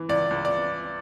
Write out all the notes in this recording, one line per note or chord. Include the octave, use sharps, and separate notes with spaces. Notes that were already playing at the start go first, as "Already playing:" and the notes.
Already playing: E3
C#2 D5
C#2
D5